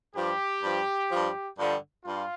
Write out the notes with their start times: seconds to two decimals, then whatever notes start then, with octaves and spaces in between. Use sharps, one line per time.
0.14 G2 F3 G4
0.62 G2 F3
1.10 G2 F3
1.57 G2 D3 F3
2.05 G2 F4